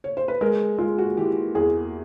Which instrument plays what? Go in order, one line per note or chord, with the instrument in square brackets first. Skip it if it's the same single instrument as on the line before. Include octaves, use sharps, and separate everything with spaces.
[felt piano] C#5
C5
B4
[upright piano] G#3 [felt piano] A#4
[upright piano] G#3 [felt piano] F4
[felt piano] F#4
[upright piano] E3 [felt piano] G4
[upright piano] E2 [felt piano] G#4